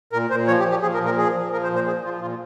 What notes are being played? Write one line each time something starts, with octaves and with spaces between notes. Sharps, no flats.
A#2 A#4
A#2 C5
F3 C#5
G4
F3
G4
F3 G#4
A#4
A#2
A#4
F3 G#4
F3
F3 A#4
C5
A#2
C5
F3 G#4
F3 F4
A#2 F4